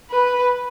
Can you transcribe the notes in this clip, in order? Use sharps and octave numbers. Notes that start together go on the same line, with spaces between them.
B4